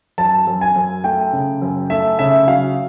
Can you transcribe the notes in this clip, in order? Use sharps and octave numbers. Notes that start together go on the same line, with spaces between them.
F#2 A5
F#2
G#5
F#2
A3 G5
C#3
F#2
A3 E5
C#3 E5
F#3 F5